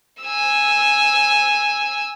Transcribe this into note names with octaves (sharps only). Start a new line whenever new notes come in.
G#5 E6